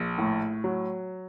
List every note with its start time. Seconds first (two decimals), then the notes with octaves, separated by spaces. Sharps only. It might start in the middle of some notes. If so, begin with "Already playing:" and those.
Already playing: A#1
0.18 A2
0.64 F#3